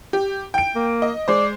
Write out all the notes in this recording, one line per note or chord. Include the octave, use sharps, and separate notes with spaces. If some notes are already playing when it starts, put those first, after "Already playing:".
G4
G5 D7
A#3
D#5
G#3 C5 D5